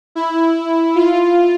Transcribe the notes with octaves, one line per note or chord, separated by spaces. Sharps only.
E4
F4